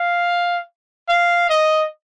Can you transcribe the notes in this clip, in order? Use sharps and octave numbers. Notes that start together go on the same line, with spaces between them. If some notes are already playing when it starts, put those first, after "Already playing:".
Already playing: F5
F5
D#5